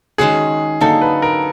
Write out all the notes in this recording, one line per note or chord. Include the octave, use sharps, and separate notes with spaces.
D#3 G#3 C#4 F#4 G#4
D3 F#3 A#3 D#4 A4
B4
A#4